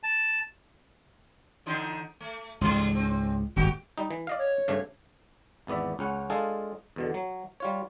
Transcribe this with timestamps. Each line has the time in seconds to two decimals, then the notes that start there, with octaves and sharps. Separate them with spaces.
0.03 A5
1.66 D3 E3 D#4
2.20 A3
2.61 C#2 G#2 E3 G3 A3
2.95 C4 C#4
3.56 D#1 G#1 G2 F#4 G4
3.98 G3 D#4
4.11 E3
4.27 D5 D#5 F5
4.39 C#5
4.68 G2 C#3 A3
5.67 G#1 E2 B3 D5 E5
5.99 C#2 C#4 F#5
6.30 G#3 D4 F4 G#4 A4 F5
6.96 E2 B2 D3
7.14 F#3
7.60 G3 F4 C#5